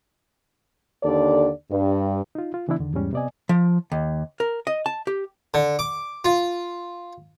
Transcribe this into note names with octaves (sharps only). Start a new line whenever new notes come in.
D#2 D3 A4 D5
G2
D#4 F4
F4
C#3 E3 B3 D4 E4
E2 D3 D#3
E2 G#2 G3 C#4
C3 B3 D5 D#5 G#5
F3
D#2
A#4
D#5
A5
G4
D3
D6
F4